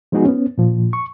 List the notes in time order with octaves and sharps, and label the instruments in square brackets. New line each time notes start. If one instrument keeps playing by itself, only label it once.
[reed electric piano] F3 G#3 B3 D#4 F#4 G#4
B3 C#4
A#2 F3
C#6